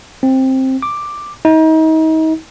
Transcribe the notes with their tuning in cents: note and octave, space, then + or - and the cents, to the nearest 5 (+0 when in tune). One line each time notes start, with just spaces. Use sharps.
C4 +10
D6 +5
D#4 +35